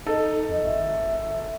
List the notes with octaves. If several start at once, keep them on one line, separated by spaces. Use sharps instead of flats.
D#4 A4 D#5
F2
G#1 E5